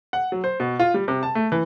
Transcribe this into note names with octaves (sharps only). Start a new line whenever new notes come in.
F#5
F#3
C5
B2
F4
G3
C3
A5
A3
E3